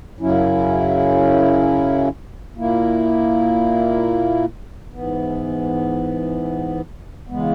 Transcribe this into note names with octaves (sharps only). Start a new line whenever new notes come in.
F#2 C#3 F#3 C#4 E4
A#2 A#3 E4
G#2 E3 B3
C#3 E3 G#3 B3